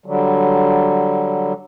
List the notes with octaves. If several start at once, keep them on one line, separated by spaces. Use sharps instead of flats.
D3 F#3 G3